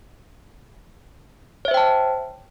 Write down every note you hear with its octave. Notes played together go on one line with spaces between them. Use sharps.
C5 C#5 E5 G5 A5